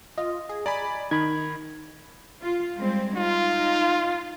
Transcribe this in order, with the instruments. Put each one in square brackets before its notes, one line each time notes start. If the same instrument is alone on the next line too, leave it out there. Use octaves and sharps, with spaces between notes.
[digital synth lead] F4 [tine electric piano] D#5
[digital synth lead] G#4
[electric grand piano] D5 G#5 B5 [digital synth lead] A#5
[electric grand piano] D#3 [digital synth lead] D#4 [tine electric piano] B5 G#6
[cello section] F4
G3 G#3 C4
[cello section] D#4 [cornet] F4